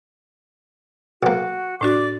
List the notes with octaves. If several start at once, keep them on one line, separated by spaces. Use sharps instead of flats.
B1 A#3 F#4
A2 D4 F#4 D5 D6